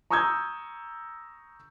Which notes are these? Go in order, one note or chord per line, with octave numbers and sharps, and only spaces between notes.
A#5 C#6 D#6 E6 G6 G#6